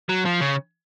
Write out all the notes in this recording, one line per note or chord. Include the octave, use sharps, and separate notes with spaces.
F#3
F3
C#3